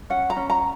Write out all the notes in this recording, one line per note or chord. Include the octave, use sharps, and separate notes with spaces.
C#4 F#5
A#5
C#4
A#5